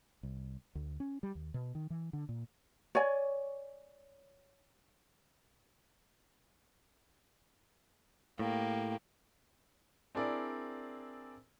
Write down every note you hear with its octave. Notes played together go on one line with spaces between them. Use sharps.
C2
D2
C#4
G3
D#2
B2
D#3
E3
D3
A#2
C#5 D5 G#5
A2 A#3 G4
C4 D4 E4 G#4 A#4 D5